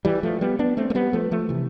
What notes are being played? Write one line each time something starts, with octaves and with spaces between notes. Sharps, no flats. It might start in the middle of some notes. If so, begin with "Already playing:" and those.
E3 G3
F3 A3
G3 B3
B3 D4
A3 C4
A3
G3 B3
F3 A3
F3 A3
C3 E3